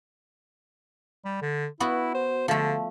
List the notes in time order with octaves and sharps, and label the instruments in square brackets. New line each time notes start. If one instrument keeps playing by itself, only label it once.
[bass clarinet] G3
D3
[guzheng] B3 F#4 [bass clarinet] E4
[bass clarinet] C5
[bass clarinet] D3 [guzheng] F3 A3